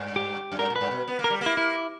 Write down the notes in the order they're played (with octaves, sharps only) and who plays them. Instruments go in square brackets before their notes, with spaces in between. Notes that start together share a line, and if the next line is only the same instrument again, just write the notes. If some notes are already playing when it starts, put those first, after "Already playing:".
Already playing: [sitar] G2
[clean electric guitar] G4
[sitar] F#2
[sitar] G2 [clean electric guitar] A#4
[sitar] A#2
[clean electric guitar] B4
[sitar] G2
B2
B3
A#3
[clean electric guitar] A#4
[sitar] G3
A#3
[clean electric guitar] E4
E4